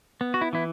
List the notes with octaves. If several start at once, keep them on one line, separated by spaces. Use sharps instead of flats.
B3
F#4
E4
E3 E4